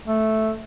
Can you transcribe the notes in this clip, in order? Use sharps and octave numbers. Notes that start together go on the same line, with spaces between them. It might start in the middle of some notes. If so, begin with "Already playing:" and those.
A3